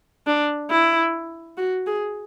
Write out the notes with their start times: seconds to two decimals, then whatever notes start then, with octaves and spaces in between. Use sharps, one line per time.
0.27 D4
0.70 E4
1.57 F#4
1.86 G#4